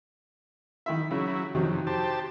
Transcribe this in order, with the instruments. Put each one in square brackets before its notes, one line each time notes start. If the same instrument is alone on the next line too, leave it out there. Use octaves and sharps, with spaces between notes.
[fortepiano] D#3 E4 E5
[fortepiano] C#3 [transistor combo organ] F#3 E4
[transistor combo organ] F2 [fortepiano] C3 D#3 F#3
[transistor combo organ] G4 C5 A5